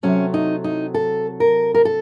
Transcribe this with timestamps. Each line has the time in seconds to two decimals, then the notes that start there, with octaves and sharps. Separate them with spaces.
0.03 C3 F#3 A3 C#4
0.34 D#4
0.64 D#4
0.94 A4
1.40 A#4
1.74 A#4
1.85 A4